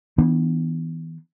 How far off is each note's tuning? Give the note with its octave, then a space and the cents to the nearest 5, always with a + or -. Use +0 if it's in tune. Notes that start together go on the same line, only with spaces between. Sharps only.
E3 -25 B3 +0 D4 +15